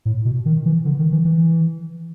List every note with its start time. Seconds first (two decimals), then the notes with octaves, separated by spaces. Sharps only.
0.05 A2
0.25 B2
0.46 D#3
0.66 E3
0.85 D3
0.99 D#3
1.12 E3
1.25 E3